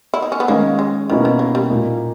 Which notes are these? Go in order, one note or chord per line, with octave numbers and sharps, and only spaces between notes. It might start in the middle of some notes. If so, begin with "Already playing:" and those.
E4
D#4
C#4
B3
D#3 G#3 A#3 C#4
G#3
B2 D#3 A#3 C#4 E4 A#4
D#3
A#3
G3
A#2 A#3 D#4